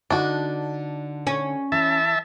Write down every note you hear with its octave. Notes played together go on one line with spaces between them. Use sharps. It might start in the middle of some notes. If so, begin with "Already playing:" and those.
D3 D4 D#4 F#4
C#4
E3 E5 A5